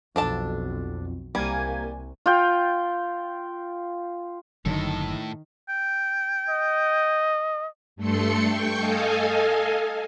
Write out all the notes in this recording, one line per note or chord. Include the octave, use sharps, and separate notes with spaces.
B1 F2 B2 D4 A4 A5
C2 G3 A#3 G#5
F4 G5
F#1 A2 D3 D#3 F#3 A4
G5
D#5
G2 A3 A4 C6 C#7
G5 C#6 G6
A4 D#5 F5 G#5